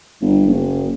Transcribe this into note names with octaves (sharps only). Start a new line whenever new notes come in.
G1
F#1